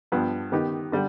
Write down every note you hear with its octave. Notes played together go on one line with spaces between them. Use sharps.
G2 F3 B3
D#3 B3 D#4 G4
D3 G3